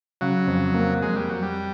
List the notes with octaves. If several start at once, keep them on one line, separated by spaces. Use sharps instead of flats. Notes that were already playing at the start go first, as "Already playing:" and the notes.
C#3 F#3
F2
A#3
F2 G#3
G3
F2 F#3
G3